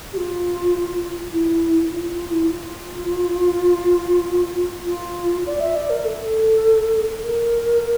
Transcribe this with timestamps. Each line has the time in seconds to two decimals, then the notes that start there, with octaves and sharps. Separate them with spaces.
0.13 G4
0.17 F4
1.32 E4
1.90 F4
2.10 F4
2.31 E4
2.50 F4
4.86 F4
5.47 D5
5.60 E5
5.76 D5
5.90 A#4
6.05 A4
7.23 A#4